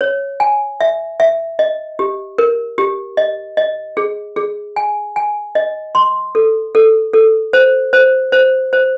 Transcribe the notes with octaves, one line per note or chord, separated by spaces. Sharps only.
C#5
G#5
E5
E5
D#5
G4
A#4
G4
D#5
D#5
G#4
G#4
G#5
G#5
D#5
C6
A4
A4
A4
C5
C5
C5
C5